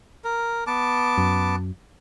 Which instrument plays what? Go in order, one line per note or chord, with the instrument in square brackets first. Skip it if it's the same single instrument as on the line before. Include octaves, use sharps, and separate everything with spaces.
[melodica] A#4
B3 A5 D6
[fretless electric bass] F#2